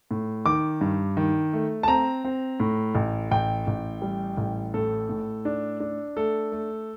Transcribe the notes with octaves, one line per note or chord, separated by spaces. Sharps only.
A2
D#3 D6
G2
D#3
A3
A5
C4 A#5
C4
A2
A1
A1 G5
A1
G3
A1
A2 A4
A2
D4
D4
A3 A4
A3